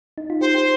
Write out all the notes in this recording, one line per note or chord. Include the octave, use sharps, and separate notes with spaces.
D#4
F4
G4 C5
G4